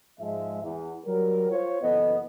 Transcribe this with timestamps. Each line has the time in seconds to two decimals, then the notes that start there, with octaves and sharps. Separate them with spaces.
0.20 G#2 F3 G#3 E5
0.63 E2
1.05 F#3 G3 A#4
1.50 F4 C5 C#5
1.82 F#1 E3 B3 A4 D#5